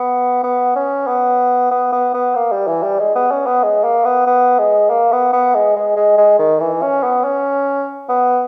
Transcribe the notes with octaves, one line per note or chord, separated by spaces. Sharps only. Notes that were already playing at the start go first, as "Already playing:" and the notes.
Already playing: B3
B3
C#4
B3
B3
B3
B3
A#3
G3
E3
G3
G#3
B3
C#4
B3
G#3
A#3
B3
B3
G#3
A#3
B3
B3
G#3
G#3
G#3
G#3
D#3
E3
C#4
B3
C#4
B3